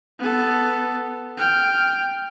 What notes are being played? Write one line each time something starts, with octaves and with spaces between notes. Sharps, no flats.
B3 A4
G5 F6